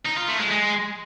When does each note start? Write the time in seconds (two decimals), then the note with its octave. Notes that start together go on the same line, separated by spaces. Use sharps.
0.06 D#4
0.17 F4
0.29 A3
0.40 G#3
0.51 G#3